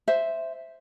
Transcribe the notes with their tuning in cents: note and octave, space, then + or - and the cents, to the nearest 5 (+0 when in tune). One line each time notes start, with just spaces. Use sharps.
C5 +0 E5 +0